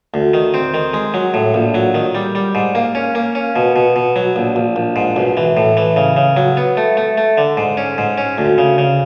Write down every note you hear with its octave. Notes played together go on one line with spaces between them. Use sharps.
D2
D#3
C4
D#3
G#3
F#3
A2
A#1
F#3
D#3
G3
G3
G#2
A#3
C#4
A#3
C#4
B2
B2
B2
F#3
A#1
A#1
A#1
G#2
B1
E3
A2
E3
C#3
C#3
F#3
B3
A3
A3
A3
D3
G#2
C#4
G#2
C#4
D2
C#3
C#3